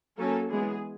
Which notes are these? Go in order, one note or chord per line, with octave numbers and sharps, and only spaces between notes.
F#3 A#3 C#4 A4
E3 G#3 B3 G#4